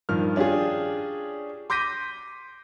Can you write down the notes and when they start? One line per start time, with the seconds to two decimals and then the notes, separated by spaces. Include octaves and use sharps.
0.09 G2 D#3 F3 F6
0.36 C#4 D4 F4 G4 G#4
1.70 C6 D6 G6 A#6 B6 D#7